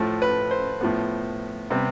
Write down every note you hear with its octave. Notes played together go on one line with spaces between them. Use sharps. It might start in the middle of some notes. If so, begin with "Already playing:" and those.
Already playing: A2 F3 A3
B4
C5
A2 F3 B3
C3 G3 B3